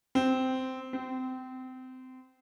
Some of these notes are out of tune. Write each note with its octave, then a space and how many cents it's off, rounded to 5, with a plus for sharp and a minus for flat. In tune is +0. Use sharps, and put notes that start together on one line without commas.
C4 -10
C4 -25